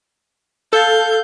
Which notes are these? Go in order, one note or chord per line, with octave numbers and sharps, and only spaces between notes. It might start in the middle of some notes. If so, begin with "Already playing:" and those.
A4 F5 G6